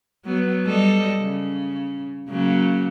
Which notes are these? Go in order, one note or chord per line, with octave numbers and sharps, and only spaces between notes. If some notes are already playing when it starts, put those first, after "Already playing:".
F#3 B3
G3 A4 D#5
C#3
C#3 F#3 A#3